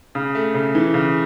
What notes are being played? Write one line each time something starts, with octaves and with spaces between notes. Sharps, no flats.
C#3
A3
C#3
E3
C#3